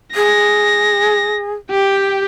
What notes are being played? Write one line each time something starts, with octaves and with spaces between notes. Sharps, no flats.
G#4 A#6
G4 G5